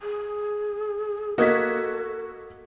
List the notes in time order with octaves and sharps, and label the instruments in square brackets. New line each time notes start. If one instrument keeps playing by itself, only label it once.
[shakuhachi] G#4
[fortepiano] A#3 D#5 [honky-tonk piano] F#4 G#6 B6 [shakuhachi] A4